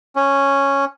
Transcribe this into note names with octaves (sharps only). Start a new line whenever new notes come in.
C#4